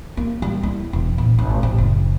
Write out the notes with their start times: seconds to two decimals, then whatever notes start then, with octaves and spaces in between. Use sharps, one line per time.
0.17 A#3
0.42 G3
0.63 E4
0.93 E1
1.18 A#1
1.38 G#1
1.63 A1
1.78 F#1